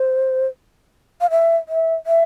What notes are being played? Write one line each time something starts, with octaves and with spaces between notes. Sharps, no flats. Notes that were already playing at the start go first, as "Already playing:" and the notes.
Already playing: C5
F5
E5
E5
E5